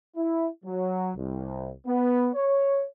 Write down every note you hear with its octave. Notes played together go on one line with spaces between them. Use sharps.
E4
F#3
C2
B3
C#5